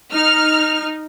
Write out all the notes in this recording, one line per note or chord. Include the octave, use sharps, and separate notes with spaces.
D#4 F6